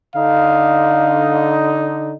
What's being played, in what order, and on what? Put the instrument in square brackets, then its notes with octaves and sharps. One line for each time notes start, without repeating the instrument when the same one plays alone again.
[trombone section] D3 D#4 [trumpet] F5